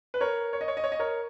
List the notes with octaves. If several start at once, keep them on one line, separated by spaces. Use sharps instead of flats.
B4
A#4 C#5
C#5
D#5
C#5
D#5
C#5
D#5
A#4 C#5